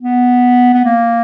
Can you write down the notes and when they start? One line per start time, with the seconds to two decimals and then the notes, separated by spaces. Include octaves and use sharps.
0.01 B3
0.73 B3
0.85 A#3